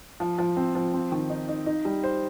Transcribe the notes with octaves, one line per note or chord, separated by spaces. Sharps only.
F3
F3
C4
F3
C4
D#3
D#4
D#4
D#4
G3
C5